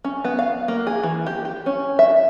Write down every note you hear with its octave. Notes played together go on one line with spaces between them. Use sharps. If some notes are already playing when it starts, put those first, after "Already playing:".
C#4
B3
F5
A#3
G#4
E3
G4
G4
C#4
E5